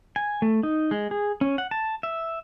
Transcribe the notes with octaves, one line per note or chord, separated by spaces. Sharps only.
G#5
A3
D#4
G#3
G#4
C#4
F#5
A5
E5